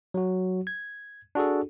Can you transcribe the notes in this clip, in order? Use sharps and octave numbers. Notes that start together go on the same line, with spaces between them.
F#3 F#4
G#6
D4 F#4 G#4 A4